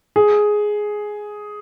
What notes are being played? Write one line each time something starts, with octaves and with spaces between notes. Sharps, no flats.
G#4